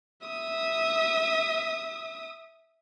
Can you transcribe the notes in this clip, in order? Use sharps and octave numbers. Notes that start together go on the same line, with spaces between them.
E5 D#6